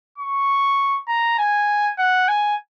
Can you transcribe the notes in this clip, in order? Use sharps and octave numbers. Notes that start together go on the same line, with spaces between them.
C#6
A#5
G#5
F#5
G#5